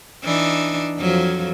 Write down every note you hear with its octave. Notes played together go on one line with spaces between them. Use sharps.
E3 D4 D#4
F2 F3 F#3